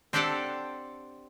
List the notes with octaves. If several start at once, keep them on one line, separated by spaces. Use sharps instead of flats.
C4 D4 G4 A4 D5 F#5